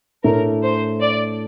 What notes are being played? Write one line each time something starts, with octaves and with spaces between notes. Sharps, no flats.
A2 A3 D4 A#4
C5
D5